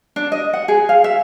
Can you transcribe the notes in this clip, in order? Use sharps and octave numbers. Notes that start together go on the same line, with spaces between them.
D4
D#5
F#5
G#4
F5
E5